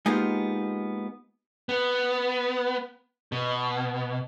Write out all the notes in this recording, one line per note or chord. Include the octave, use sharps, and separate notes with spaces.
G#3 A#3 B3 D#4 F4 G4
B3
B2